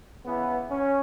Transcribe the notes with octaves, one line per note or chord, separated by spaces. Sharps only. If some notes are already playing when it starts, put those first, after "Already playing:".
C#3 E3 B3
C#4